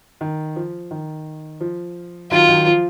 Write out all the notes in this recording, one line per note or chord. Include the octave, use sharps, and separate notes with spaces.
D#3
F3
D#3
F3
D#3 F#3 F4
D#3 F#3
F3